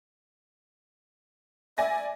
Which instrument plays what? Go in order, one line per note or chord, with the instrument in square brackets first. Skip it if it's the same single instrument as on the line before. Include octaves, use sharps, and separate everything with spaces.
[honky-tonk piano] D5 G#5 A#6 [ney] E5